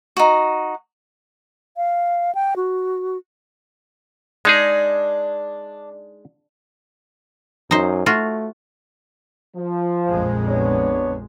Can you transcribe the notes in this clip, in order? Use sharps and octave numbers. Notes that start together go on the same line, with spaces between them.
D#4 F#4
F5
G5
F#4
G#3 D4 D#4 G#4
F#2 D#4 C5
A3 F4 F#4
F3
A#1 F2 G#3
B3 D4 C#5